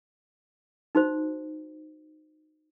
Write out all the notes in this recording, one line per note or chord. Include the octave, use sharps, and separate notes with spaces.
D#4 F#4 C5